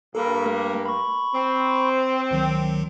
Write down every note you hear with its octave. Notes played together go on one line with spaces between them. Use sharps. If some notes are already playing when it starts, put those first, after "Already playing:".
G2 A#3 A4
A3
B5 C#6
C4
C#2 D#3 F#3